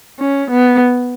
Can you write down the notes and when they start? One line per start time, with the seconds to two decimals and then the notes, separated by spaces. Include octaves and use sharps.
0.19 C#4
0.51 B3